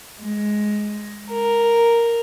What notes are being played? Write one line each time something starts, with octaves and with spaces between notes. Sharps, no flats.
G#3
A#4